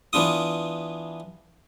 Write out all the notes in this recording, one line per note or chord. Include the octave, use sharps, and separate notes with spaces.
E3 B3 D4 F4 D#6